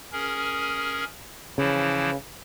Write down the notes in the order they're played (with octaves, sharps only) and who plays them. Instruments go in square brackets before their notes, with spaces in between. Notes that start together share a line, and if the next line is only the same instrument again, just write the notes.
[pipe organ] C#4 G#4 A#4
[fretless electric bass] C#3 [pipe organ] E3 F3 E4